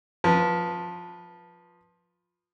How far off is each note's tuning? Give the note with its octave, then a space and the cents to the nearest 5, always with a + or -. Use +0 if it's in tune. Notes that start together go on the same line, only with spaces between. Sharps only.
F3 +15 B4 -15